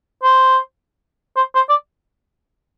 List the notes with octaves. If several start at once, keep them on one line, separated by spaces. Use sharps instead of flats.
C5
C5
C5
D5